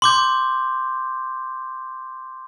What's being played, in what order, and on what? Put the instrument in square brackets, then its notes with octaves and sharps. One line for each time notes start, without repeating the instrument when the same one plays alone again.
[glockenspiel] C6 D6 G6